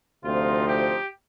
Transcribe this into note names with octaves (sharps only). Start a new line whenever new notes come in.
D2 C3 F3 C4 D#4 F4
G4